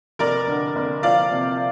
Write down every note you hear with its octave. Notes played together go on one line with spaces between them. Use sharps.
F1 A#4 D5
D3
F1
F3 D5 F5
C3